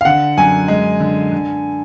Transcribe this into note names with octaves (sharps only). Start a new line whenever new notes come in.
F5
D3 F#5
F#2 G#5
G#3
D3
D3